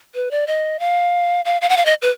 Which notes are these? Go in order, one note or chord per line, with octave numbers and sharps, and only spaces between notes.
B4
D5
D#5
F5
F5
F5
F#5
F5
D#5
B4